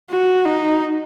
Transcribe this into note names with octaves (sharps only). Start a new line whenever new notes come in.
F#4
D#4